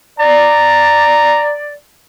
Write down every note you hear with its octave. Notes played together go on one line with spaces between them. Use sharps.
D5 A#5